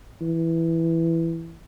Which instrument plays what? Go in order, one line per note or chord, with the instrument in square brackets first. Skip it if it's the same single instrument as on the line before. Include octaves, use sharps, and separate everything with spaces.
[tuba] E3